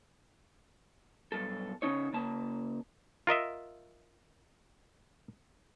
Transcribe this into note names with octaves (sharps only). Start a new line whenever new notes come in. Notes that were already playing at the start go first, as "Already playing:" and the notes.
B1 G2 A4
C#3 C#4 D#4 C#5
C#3 A#3 A5
F4 A#4 D#5 E5